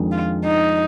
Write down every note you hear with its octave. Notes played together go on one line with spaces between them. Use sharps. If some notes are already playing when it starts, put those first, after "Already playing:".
Already playing: F2 D#3 G#3 D4
F4
D#4